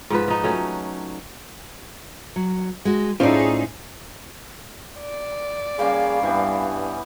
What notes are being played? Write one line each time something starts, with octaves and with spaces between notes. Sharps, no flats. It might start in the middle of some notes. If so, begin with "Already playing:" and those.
G#2 F3 B4
F3 D#4
F#3 A3 C#4
F#3
G#3 F#4
A2 A3 C#4 D#4 F4 G#4 C5 D5
D5
G3 A#3 C#4 G#4 F5
G2 E3 G3 B3